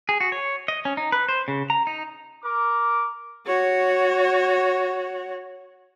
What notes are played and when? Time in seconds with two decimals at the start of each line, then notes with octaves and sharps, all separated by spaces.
0.09 G#4
0.20 F#4
0.32 C#5
0.68 D#5
0.85 C#4
0.97 D#4
1.12 B4
1.29 C5
1.48 C#3
1.70 A#5
1.87 D#4
2.43 A#4 D6
3.47 F#4 C#5